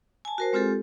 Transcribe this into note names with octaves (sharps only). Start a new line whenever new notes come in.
G#5 A5
F#4 A#4 C5
G#3 C4 F4 G4 A4